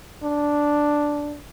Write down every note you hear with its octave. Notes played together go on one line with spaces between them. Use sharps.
D4